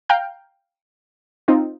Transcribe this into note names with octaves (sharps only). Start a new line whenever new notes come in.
F5 G5 A#5 F6 G6
C4 D#4 F4